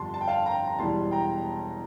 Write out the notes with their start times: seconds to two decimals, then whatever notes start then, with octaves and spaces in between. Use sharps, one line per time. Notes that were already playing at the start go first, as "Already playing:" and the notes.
Already playing: G1 F2 D3 G3 A5 C6
0.14 A5
0.21 G5
0.28 F5 A5
0.46 G5 A#5
0.67 A#5
0.78 E1 E2 E3 G3 A5 C6
1.11 G5 A#5